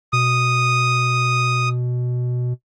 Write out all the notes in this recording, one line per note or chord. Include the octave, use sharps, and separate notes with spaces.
B2 D#6